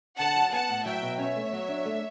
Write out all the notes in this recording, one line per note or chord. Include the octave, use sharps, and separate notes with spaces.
D3 F#5 A5
F#2
B3 F#5 A5
A2
F#3 E5 G5
B2
C#4 C#5 E5
A3
F#3
D4
A3